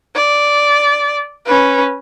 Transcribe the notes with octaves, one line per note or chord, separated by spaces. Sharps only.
D5
C#4 B4